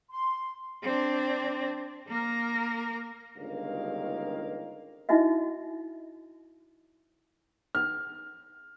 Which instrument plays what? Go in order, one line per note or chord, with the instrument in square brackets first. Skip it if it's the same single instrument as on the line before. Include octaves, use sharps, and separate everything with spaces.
[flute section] C6
[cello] C4 D4
A#3 A#4
[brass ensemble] G1 C#2 G2 D#3 A#3 F5
[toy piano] D#4 E4 F#4 D#5 E5
[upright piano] F6